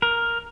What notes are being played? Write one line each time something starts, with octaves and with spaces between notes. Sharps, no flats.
A#4